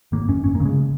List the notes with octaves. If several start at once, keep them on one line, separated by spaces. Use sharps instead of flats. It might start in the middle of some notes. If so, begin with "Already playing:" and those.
G#1 A#3
F#2 C#4
G#1 C#4
A#3
C#3
G#3